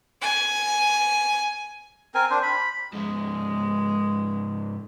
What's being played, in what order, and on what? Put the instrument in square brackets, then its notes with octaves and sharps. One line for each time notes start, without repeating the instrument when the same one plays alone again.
[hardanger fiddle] G#5
[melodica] C4 A#4 G#5
D4 C5
B5
[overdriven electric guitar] G#2 F3 [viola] G#3